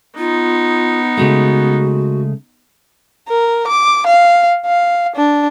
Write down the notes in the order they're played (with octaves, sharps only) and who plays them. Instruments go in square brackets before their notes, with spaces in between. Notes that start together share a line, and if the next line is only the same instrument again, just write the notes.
[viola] B3 D#4 [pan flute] F4
[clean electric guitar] C#3 G#3 A3 [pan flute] F#4
[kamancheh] A#4
D6
F5
F5
D4